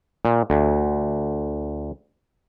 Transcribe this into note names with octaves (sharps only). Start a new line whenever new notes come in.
A#2
D2